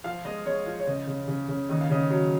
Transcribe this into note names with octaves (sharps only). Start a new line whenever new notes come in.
F3 F5
G#3 D#5
G#3 C#5
F3 F5
C#5
C#3 D#5
C#3
C#3
C#3
D#2 D#5
F5
C#3 D#5
F#3